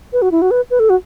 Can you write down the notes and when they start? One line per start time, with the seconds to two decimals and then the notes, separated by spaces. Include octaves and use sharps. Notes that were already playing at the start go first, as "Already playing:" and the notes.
0.13 B4
0.22 F#4
0.31 E4
0.42 F#4
0.51 B4
0.70 B4
0.79 A4
0.90 F#4